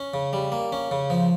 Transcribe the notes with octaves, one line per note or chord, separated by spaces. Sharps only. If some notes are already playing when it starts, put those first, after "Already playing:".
Already playing: C#4
C#3
G3
A#3
C#4
C#3
F3